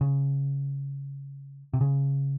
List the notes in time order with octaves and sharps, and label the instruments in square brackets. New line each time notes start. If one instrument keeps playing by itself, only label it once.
[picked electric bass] C#3
C3
C#3